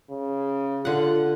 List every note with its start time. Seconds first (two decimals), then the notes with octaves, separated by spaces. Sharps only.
0.10 C#3
0.85 D3 F4 F#5